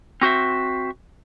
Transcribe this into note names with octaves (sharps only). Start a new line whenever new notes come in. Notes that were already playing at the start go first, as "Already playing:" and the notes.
C4 F#4 C5 E5